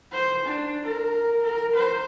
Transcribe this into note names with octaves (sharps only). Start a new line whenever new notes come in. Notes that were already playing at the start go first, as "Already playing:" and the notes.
C5
D4
A#4
A#4
C5